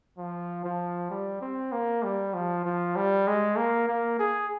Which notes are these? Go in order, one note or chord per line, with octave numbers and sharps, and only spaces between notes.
F3
F3
G3
C4
A#3
G3
F3
F3
G3
G#3
A#3
A#3
G#4